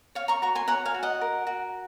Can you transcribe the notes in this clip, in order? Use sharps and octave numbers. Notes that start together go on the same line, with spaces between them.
C#5 F5
A#5 C#6
F#4 A#5 C#6
G#5 C6
C#5 F#5 A#5
F5 G#5
F#4
D#5 F#5
A#4
F#4